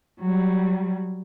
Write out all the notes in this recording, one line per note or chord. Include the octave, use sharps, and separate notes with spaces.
F#3 G3